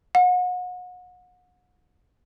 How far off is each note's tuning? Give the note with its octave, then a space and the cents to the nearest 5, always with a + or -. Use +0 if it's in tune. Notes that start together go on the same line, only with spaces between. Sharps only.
F#5 -35